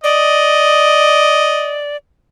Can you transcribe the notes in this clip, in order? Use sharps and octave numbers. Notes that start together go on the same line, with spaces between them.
D5 D#5